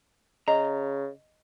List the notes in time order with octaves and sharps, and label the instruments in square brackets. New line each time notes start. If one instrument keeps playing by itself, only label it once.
[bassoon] C#3 [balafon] D#5 [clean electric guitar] A#5